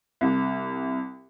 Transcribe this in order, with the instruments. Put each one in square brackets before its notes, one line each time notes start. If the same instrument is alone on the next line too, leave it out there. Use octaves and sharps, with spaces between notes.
[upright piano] C2